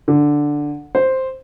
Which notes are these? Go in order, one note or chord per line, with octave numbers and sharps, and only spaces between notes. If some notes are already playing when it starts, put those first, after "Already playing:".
D3
C5